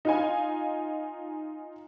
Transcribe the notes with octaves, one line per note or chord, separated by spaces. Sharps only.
D#4 F4 G#5